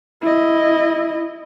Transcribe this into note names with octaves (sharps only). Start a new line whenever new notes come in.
E4 D#5